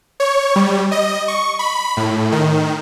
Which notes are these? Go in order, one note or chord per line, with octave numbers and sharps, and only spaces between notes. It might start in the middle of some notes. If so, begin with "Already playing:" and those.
C#5
G3
D#5
C#6
B5
A2
D#3